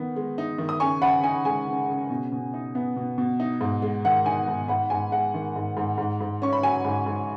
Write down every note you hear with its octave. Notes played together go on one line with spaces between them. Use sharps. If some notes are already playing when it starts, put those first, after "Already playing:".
Already playing: D#3 B3 D#4
G#3
D#4
D#3
D#6
C#3 G#5 C#6
C#3 F#5 B5
D#4 G#5
G#3 G#5
C#3
C#3
B2
B2
D#4
B3
B2
B2
D#4
G#2
G#3
D#3 F#5
D#4 G#5
G#2
G#2 F#5 B5
G#2 G#5
G#3 F#5
D#3
G#2
G#2
G#2
G#2
C#4 C#6
B5
F#3 G#5
G#2
G#2